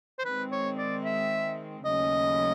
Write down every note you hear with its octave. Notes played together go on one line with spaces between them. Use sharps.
C5
D#3 G#3 C4 B4
C#5
D5
E5
D#2 C#3 F#3 A3 C#4 D#5